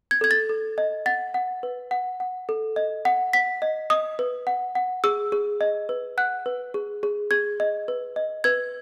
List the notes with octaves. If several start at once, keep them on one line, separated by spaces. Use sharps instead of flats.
G#6
A4 G#6
A6
A4
D#5
F#5 A6
F#5
B4
F#5
F#5
A4
D#5
F#5
F#5 B6
D#5
D#5 D#6
B4
F#5
F#5
G#4 E6
G#4
D#5
B4
F#5 F#6
B4
G#4
G#4
G#4 G#6
D#5
B4
D#5
B4 G#6